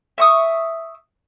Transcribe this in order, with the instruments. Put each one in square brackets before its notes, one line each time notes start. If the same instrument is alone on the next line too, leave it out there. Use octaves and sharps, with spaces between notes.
[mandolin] E5 C#6 D#6